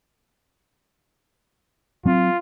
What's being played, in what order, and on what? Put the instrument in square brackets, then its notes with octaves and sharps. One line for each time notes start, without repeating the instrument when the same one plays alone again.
[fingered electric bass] F#3 C4 [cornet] F4